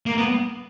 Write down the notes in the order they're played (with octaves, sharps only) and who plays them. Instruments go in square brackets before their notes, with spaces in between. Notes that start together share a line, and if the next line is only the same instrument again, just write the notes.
[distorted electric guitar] A#3
B3